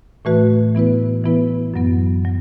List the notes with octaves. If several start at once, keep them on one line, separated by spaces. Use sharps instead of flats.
A2 E3 A3 F#4 B4
E3 B3 E4 B4
E3 B3 E4 B4
F#2 F#3 B3
F#3